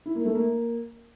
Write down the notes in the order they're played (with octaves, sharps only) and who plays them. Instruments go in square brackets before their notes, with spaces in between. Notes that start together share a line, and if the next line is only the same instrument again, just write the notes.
[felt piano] E4
A#3
A3
A#3